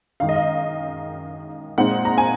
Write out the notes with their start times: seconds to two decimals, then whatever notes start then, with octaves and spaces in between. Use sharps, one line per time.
0.20 F#2 D#3 G#3 F5
0.29 D#5
0.36 F5
1.78 A#2 G#3 C4 D#4 F#5
2.05 A#5
2.18 G#5